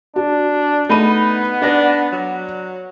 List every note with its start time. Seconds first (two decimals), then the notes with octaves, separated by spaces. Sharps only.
0.16 D4 F#4
0.89 A3 B3 D#4 B5 D#7
1.62 D4 D5 A#6
2.12 F#3